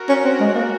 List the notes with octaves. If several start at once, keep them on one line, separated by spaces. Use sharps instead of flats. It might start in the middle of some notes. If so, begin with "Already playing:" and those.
Already playing: F#4 A#4
C#4
C4
G#3
A#3 F#4 A#4